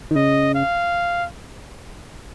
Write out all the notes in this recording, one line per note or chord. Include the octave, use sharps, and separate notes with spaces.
D#3
C#3 D#5
F5